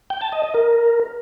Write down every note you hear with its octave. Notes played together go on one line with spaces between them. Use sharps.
G5
A5
D#5
D#5
A#4